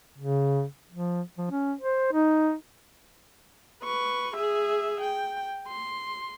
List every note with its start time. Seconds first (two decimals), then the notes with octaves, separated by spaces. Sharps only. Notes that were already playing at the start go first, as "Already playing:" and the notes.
0.18 C#3
0.91 F3
1.38 F3
1.51 C#4
1.81 C5
2.13 D#4
3.83 B4 C#6
4.35 G#4 E5
5.01 G5
5.68 C6